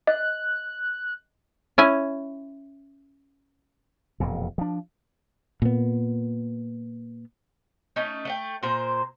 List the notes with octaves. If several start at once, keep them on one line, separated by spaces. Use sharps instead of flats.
D#5 F#6
C#4 E4 G#5
E1 F2 A#2
F3 D4
A#2 B3
A3 C#4 D#4
A3 D4 G5
A#2 A#4 C5